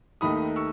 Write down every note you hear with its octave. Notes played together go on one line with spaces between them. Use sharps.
D#2 D#3 A3 D#4 B5 D#6
C#6 E6